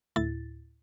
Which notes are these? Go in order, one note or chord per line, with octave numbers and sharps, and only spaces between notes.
D2 A2 E4 A6